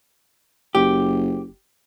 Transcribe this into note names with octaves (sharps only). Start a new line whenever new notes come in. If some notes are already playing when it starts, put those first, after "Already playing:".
F#1 G4